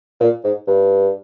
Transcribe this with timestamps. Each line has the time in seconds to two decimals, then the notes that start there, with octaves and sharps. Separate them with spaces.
0.20 A#2
0.44 G#2
0.67 G2